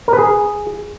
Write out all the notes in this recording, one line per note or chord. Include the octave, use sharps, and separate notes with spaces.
A#4
B4
G#4